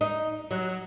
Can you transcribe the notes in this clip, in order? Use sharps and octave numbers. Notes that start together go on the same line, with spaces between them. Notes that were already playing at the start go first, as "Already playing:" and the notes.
D#4
F#3